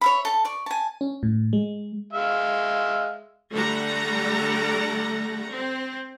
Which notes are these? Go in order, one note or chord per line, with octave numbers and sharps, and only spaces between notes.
C#5 E5 B5
A4 A5
D5 C#6
G#5 A5
C#4
A2
G#3
G#3 E5 F5
D3 G3 A3 A4 F#5 A#5
C4